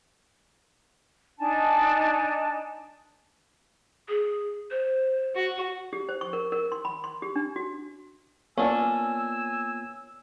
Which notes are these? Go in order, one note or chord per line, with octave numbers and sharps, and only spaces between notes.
D4 D#4 G#5 A5
G#4
C5
F#4
G4
C5
C#6
A#4
A#4
C6
B5
C6
G4
D4
F#4
A#3 B3 C#4 D4 F4 G#5 E6